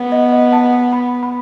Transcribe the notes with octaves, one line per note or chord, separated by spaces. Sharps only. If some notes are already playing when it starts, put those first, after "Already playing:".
Already playing: B3
D#5
D#5
A5
B5
B5